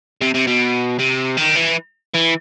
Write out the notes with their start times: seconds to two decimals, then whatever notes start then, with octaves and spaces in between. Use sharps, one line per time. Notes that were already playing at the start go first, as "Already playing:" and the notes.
0.21 C3
0.34 C3
0.47 B2
0.99 C3
1.37 D#3
1.56 E3
2.15 E3